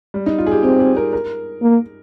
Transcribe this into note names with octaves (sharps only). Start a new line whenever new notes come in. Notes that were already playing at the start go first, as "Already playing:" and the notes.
G3
D#4
F4
G#4
G4
C4 G4
G#4
A#4
A#4
A#3